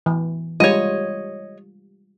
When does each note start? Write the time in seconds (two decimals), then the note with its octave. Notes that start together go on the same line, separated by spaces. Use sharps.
0.06 E3
0.60 G3 G#3 F4 C#5 D#5